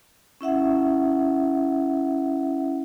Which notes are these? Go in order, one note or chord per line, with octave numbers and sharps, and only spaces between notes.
C#4 E4 E5 F#5